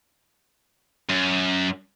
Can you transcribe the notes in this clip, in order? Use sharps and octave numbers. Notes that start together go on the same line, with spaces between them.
F#2